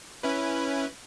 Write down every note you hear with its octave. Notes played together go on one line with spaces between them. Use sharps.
C#4 E4 B4